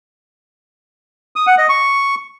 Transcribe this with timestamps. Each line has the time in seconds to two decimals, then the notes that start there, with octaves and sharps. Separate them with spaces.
1.36 D#6
1.47 F#5
1.58 D#5
1.69 C#6